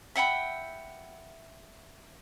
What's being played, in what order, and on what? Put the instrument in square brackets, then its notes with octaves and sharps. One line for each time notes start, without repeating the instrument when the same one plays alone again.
[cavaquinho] E5 F#5 G5 B5